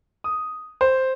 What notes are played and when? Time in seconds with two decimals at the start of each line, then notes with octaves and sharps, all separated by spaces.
0.24 D#6
0.81 C5